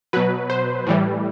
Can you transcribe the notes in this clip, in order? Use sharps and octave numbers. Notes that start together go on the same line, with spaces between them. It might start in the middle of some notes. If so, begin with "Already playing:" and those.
B2 F#3 B4
C5
A2 E3 G3